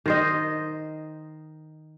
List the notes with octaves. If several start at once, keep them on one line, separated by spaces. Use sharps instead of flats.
D#3 C5 D#5